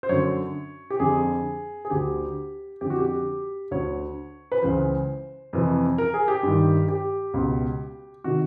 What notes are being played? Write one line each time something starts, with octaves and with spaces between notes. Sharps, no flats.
C5
F#2 D3 C#5
G4
F2 D3 G#4
G#4
D2 D3 G4
F2 D3 G4
F#4
G4
D2 D3 C#5
B4
C#2 C#3 E3 C5
F2 C3 E3
A#4
G#4
G4
G2 D#3
G4
C#2 B2
C3 D#3 F#4